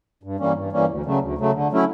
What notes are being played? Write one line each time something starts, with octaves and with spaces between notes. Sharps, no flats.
G2
E3 G3 A#3 C#4
G2
E3 G3 A#3 C#4
D2
C#3 F#3 A3
D2
C#3 F#3 A3
D3
F#3 A3 C#4 E4